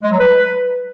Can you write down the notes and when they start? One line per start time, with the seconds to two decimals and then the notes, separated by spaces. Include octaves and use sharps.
0.02 G#3
0.10 F#3
0.18 B4